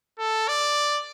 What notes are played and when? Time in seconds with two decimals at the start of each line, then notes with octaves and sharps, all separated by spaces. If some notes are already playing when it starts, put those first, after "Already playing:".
0.19 A4
0.48 D5